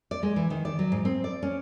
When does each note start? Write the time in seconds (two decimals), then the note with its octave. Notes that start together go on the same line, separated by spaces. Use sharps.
0.11 D5
0.23 G#3
0.36 E3
0.50 D#3
0.65 D5
0.79 F#3
0.92 G#2
1.05 C4
1.24 D5
1.43 C#4